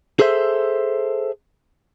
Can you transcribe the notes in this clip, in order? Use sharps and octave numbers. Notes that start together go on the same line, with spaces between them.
G#4 A4 C5 E5